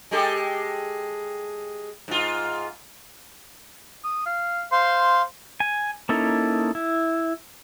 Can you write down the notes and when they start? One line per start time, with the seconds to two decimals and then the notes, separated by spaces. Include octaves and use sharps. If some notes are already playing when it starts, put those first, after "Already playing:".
0.11 G#3 G4 A4
2.08 G#2 F4
4.04 D#6
4.26 F5
4.72 C5 F5 C6
5.60 G#5
6.09 A#3 C#4 D#4 E4 A4
6.75 E4